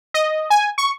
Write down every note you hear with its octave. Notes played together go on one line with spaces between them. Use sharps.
D#5
G#5
C#6